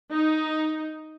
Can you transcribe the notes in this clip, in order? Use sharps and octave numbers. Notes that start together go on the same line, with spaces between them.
D#4